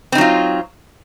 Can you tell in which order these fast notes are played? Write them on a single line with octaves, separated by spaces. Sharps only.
C4 D#4 F#3 F4